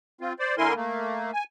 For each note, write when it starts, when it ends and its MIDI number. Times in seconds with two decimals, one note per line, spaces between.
0.21 0.33 60
0.21 0.33 65
0.39 0.55 72
0.39 0.55 74
0.58 0.73 50
0.58 0.73 58
0.58 0.73 64
0.58 0.73 70
0.58 0.73 80
0.58 0.73 84
0.76 1.31 57
0.76 1.31 58
1.33 1.44 80